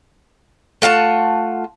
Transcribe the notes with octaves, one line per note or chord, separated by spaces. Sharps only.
A3 F4 F#5 A5